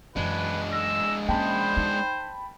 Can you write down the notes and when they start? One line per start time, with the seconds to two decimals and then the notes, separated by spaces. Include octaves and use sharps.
0.16 F#2 E3 G#3 D4 B4
0.73 E6 A#6
1.29 A#3 C#4 C5 G5 A5 B5
1.77 D#4